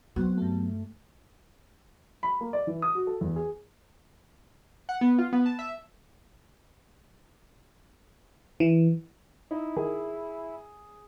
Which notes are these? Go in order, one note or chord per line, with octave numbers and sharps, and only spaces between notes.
F#3 B3 C4 F#4
G2 A3
B5
A#3
D5
E3
D#6
F#4
A4
E2
G#4
F#5
B3
F4
B3
A5
E5
E3
D#4 E4
D#3 G#4